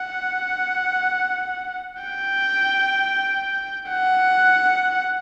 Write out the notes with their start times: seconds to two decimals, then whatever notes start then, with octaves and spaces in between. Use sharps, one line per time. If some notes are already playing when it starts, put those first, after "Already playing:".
Already playing: F#5
2.03 G5
3.90 F#5